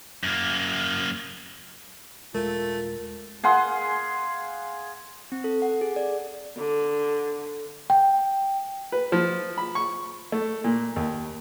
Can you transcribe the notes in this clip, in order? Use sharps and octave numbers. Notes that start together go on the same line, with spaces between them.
F#2 A#3
D#1 G#3 A3 F4 A#4
G#4 F5 F#5 C6
C4
A4
F#5
G#4
D5
D3
G5
B4
F3
B5
C#6
A3
A#2
D#2